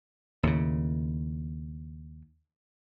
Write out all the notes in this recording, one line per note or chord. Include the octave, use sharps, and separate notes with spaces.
D#2 A2 C#3